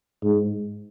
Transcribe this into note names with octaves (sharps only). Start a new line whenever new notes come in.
G#2